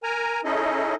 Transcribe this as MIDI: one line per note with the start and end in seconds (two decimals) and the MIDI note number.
0.03 0.41 70
0.03 0.41 80
0.03 0.41 82
0.44 0.95 61
0.44 0.95 63
0.44 0.95 64
0.44 0.95 68
0.44 0.95 69
0.44 0.95 75